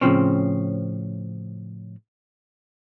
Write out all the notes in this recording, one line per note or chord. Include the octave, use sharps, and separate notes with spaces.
A2 C#3 E3 F3 C4 C#4